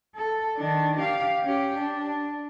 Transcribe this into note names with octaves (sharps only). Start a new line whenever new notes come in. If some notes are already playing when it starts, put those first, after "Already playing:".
A4
D#3 D4
G4 F5
C#4 G4
D4